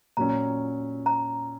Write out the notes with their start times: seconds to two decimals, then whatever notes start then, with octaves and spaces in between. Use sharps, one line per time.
0.17 A#2 F#3 C#4 A#5
1.06 A#5